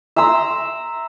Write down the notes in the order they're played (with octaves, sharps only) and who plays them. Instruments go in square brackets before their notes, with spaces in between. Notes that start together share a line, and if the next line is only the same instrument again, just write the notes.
[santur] E5 A#5 C6 E6